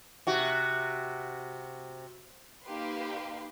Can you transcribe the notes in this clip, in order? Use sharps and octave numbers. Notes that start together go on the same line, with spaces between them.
C3 F#4
A#3 D#4 G4 B4 C6